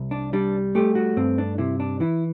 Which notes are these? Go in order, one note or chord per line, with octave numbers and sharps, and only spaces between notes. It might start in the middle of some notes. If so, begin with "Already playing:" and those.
Already playing: C2
D4
G3 D4
A3 G4
F#4
G2 C4
D4
C3 E4
D4
E3 E4